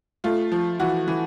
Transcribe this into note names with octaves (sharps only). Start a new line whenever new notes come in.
A3 F4
F3
E3 F#4
E3